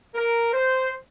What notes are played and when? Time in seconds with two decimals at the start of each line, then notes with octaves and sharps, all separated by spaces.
0.15 A#4
0.53 C5